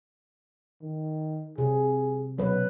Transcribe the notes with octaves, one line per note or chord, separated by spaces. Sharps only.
D#3
C3 G#4
B2 F#3 B4